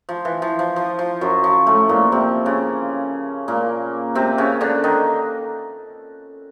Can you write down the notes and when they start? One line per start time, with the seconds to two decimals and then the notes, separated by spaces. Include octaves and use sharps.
0.09 F3
0.25 E3
0.42 F3
0.59 F3
0.76 F3
0.99 F3
1.21 F#2 F#3
1.44 F3
1.66 A2 A3
1.89 A#2 A#3
2.12 C3 C4
2.46 C#3 C#4
3.48 A#2 A#3
4.15 C3 C4
4.38 C#3 C#4
4.61 D3 D4
4.84 D#3 D#4